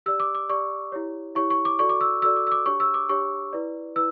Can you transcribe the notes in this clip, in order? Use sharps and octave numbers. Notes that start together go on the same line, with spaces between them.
G4 D5 E6
D6
D6
G4 D5 C#6
E4 G4 C#5
E4 G4 C#5 C#6
C#6
D6
F#4 A4 D5 C#6
D6
E6
F#4 A4 D5 E6
D6
E6
D6
D4 G4 C#5 C#6
E6
D6
D4 G4 C#5 C#6
E4 B4 D5
E4 B4 E6